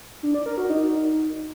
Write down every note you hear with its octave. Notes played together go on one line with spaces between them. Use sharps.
D4
D5
A#4
F#4
D#4